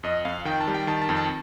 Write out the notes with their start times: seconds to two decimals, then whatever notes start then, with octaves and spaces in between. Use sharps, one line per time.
0.03 F2 D#5
0.25 F2 F5
0.45 D#3 G5
0.60 A5
0.67 G3
0.74 G5
0.87 D#3 A5
1.02 A5
1.09 F2
1.16 A5